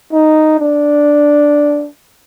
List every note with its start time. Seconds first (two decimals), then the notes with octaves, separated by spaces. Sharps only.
0.13 D#4
0.60 D4